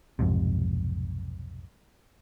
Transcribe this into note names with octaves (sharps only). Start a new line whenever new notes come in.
B1 F2 G#2 C3